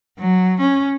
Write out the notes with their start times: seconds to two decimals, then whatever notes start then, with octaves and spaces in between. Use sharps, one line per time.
0.19 F#3
0.61 C#4